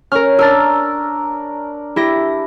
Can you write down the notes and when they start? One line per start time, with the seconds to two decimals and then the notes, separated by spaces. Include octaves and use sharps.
0.12 C#4 A#4 F6
0.39 D4 A#4 E6 F6 A6
1.96 E4 G4 A#6